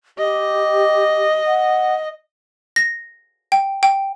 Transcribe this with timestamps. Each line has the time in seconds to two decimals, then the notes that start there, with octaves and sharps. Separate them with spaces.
0.18 G4 D#5
1.47 F#5
2.76 A#6
3.52 G5
3.83 G5